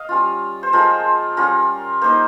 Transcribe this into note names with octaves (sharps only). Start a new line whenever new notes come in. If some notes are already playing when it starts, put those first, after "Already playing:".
Already playing: D#5 F5
G3 C#4 F4
C5
F3 G#3 C4 F4 A#4
G3 C#4 F4 A#4
A#3 D#4 C5